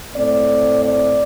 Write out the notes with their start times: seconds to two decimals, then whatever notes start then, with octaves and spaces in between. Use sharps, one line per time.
0.15 A2 A3 C4 D5
0.86 D5